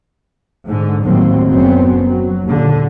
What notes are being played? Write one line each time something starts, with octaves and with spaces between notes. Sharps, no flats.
G#2 D3
G1 D#2 A2 F#3 A#3 C4
F#1 F#2 F#3 B3 C4
F#3
D#2 A#2 D3